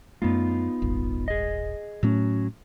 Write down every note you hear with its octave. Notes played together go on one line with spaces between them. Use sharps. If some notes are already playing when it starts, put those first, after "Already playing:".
F#2 A3 B3 D#4 F4
D#1 G#1
G#4 D#5
A2 F#3 A3 C#4